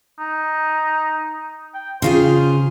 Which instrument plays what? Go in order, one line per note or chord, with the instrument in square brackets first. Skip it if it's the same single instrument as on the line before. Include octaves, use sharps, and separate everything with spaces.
[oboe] D#4
G5
[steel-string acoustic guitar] C#3 F4 G#4 [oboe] C5